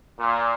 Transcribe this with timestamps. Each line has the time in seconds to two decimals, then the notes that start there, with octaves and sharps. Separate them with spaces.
0.17 A#2